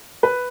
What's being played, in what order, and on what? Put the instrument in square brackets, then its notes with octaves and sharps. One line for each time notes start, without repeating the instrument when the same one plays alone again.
[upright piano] B4